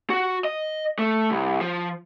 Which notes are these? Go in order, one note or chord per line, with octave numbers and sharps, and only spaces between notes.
F#4
D#5
A3
C2
F3